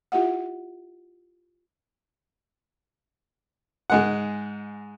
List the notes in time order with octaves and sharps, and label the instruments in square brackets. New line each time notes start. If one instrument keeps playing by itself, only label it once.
[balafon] E4 F4 G4 E5 F#5
[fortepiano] G#2 G#3 F#5